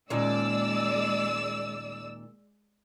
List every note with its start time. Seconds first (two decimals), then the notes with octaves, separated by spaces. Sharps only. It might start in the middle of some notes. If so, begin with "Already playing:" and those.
0.10 D#2 A#2 G#3 C#4 D5 E6